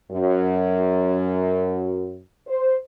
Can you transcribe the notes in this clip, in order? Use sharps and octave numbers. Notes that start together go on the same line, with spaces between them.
F#2
C5